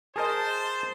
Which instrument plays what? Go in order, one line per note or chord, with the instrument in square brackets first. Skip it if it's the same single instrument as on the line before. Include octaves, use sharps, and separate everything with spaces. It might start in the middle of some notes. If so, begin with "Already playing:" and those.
[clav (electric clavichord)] G#4 A#4 D#5 [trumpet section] C5 [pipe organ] A5